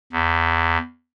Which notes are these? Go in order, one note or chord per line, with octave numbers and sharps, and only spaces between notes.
E2